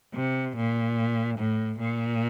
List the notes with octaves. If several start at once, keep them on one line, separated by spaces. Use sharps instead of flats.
C3
A#2
A2
A#2